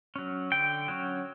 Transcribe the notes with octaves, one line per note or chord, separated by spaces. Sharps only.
F#3 C#4
D3 G5
F#3 C#4